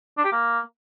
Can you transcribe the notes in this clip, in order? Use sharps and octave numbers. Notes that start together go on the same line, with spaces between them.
D4
G4
A#3